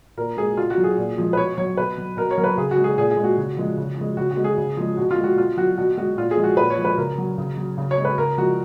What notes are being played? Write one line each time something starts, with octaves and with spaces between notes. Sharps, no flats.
A#2 A#4
G#3 G#4
B2 F4
F#4
F#3
G#4
A#2
F3 G#3
B4
B2 C#5
F#3 C#5
B2 B4
F#3
B2 A#4
C#5
F#3 A#4
B4
C#3 G#4
F#4
G#3
G#4
A#2 G#4
G#4
G#3
F#4
C#3
F3 G#3
C#3
F3 G#3
C#3 F#4
F#4
G#3
G#4
C#3
F3 G#3
B2 F#4
F4
G#3
F#4
B2 F4
F#3 F#4
B2 F#4
G#3 F#4
A#2 F4
G#4
F3 G#3
F#4
A#2 B4
C#5
F3 G#3
B4
C#3 A#4
F#3
C#3
F#3
C#3
C#5
G#3
B4
C#3 A#4
F3 G#3 F#4